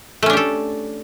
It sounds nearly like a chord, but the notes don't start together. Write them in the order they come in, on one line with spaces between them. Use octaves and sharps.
A3 C#4 D4 G4 A4